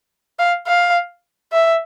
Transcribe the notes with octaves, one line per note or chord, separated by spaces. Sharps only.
F5
F5
E5